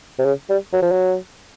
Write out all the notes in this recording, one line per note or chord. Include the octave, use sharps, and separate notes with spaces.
C3
C#3
G3
F#3
F3
F#3